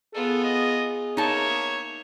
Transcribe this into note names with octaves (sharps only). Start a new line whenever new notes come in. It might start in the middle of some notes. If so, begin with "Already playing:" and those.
B3 F4 G#4 A4
D#5
A#3 D#4 C#5 E5 A5